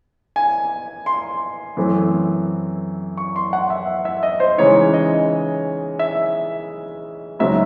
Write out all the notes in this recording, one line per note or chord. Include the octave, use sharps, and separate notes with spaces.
G#5
C6
F#2 E3 A3 C4
C#6
C6
F#5
E5
E5
D#5
C5
C#3 E3 G#3 D#4 C#5
D#5
E5
C#2 C#3 F#3 C4 D#4 E5